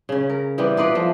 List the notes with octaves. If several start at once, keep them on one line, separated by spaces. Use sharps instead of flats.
C#3 C#4
A#4
E3 G3 B3 C4
D#4 F4 B4 D5
F3 A3